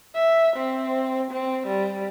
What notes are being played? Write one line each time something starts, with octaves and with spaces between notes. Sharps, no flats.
E5
C4
C4
G3